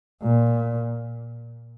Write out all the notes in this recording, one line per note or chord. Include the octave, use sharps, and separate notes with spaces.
A#2